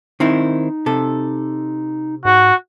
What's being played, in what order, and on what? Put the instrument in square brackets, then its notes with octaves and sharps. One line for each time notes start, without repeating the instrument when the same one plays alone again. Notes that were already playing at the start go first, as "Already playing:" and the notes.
[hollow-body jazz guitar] D#3 C4 E4 [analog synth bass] D#4
[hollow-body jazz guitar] C3 A4
[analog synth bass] G#2 [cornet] F#4